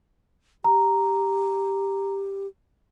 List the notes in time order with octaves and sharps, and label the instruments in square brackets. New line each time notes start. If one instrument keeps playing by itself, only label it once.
[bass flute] G4 [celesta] A#5